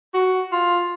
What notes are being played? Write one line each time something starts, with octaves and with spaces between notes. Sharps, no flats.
F#4
F4